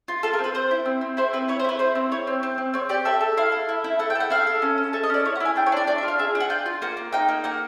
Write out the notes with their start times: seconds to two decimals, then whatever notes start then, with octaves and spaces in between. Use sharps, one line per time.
0.08 F4
0.23 F4 A4
0.33 A#4
0.39 C4
0.44 B4
0.55 C4 C5
0.71 E4
0.86 C4
1.01 C4
1.17 E4 C5
1.33 C4 B4
1.48 E4 C#5
1.59 C5
1.64 E4 B4
1.79 E4 C5
1.95 C4
2.12 E4 C#5
2.27 C4
2.43 C4
2.58 C4
2.74 C4 C#5
2.89 G4 D5
3.05 A4 E5
3.21 A4
3.37 E4 F5
3.52 A4
3.69 E4
3.84 E4
3.99 A4 F#5
4.10 G5
4.15 A4 F#5
4.30 E4 F5
4.47 A4
4.62 C#4
4.78 C#4
4.93 A4 E5
5.03 D#5
5.10 C#4 D5
5.25 E4 C#5
5.35 F#5
5.40 E4
5.45 G#5
5.56 D4 G5
5.66 C#5
5.72 D4 D5
5.87 D4 D5
5.98 E5
6.03 F4
6.08 F5
6.19 G#4 E5
6.35 D4
6.40 F#5
6.50 F4 G5
6.66 F4
6.82 A#3 F#5
6.97 A#3
7.12 D#4 G5
7.29 A#3
7.44 A#3 F#5